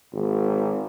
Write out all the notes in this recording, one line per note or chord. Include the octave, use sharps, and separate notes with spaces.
G#1